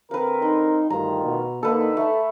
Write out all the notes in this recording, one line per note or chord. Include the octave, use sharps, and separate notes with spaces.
D3 C4 A#4 B4 F5
D#4 C6
D2 G2 D#3 F4 A#5
B2
D3 A#3 D#4 A4 B4
A3 A4